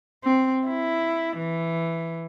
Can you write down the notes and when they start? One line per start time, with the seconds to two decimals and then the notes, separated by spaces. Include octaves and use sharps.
0.24 C4
0.67 E4
1.38 E3